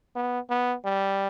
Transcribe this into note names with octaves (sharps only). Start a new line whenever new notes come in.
B3
B3
G3